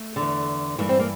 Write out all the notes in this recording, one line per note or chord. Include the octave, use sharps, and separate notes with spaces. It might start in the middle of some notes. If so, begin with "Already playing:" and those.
Already playing: A3
E2 D3
G2 E3 A#3
C4
A#3